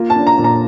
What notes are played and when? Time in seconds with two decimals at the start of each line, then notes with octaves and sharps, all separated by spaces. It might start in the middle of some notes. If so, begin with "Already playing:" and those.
Already playing: A#3 F4
0.10 A5
0.16 D4
0.27 A#5
0.39 A#2
0.44 A#5